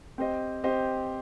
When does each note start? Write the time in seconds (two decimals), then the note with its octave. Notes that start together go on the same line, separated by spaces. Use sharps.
0.18 C4 G4 C5 D#5
0.64 C4 G4 C5 D#5